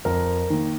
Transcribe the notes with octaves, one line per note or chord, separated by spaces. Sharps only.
F2 A#4
D#3 A#3